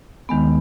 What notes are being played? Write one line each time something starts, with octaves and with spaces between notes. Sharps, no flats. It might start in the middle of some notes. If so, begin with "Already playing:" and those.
D#2 D#3 G#3 B3